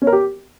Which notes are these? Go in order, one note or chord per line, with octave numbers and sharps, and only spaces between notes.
C#4
A#4
G4